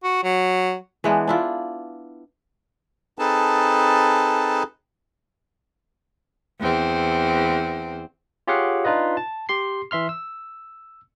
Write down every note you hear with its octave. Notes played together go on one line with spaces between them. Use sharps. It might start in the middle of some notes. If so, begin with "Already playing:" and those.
F#4
F#3
E3 G#3 B3 D4
D4 E4 F4
C4 D#4 G#4 A4 B4 A5
E2 C4
F4 G4 G#4 C#5 F5 F#5
D4 D#4 F4 B4 D#5
A5
G4 C6 C7
E3 E5 C6 F6
E6